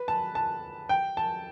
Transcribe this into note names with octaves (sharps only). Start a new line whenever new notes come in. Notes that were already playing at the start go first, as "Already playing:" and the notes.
Already playing: B4
A5
A5
G5
A5